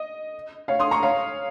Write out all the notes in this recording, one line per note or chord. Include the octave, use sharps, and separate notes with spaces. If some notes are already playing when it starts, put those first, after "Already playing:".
Already playing: D#5
C#5 F5
C6 D#6
A#5 C#6
C#5 F5